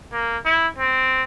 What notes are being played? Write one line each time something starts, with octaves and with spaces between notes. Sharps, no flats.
A#3
E4
C4